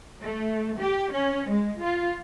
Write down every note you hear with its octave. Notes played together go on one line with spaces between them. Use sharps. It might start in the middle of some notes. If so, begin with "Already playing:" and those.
A3
G4
C#4
G#3
F4